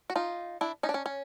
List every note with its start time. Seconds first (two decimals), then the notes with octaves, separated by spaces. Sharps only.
0.10 F#4
0.16 D#4 F4
0.61 D4 E4
0.83 C#4 D#4
0.89 D4
0.94 C#4
1.06 C#4